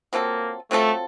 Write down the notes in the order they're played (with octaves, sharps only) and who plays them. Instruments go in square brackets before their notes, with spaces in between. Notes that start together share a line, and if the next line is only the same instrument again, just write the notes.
[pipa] F#3 C4 F4 A4 [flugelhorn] A#3
[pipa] F#3 C4 F4 A4 [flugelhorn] A3